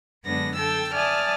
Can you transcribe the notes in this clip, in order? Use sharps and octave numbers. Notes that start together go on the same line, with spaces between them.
F#2 D3 G#3 B3 D4 A#6
A4 G5 A5 E6
D5 E5 G#5 A5 D#6 F6